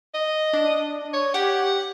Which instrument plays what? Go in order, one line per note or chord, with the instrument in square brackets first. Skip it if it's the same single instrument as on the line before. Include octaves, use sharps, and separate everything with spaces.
[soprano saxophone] D#5
[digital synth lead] D4
[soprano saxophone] C#5
[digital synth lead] G4 [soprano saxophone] F#5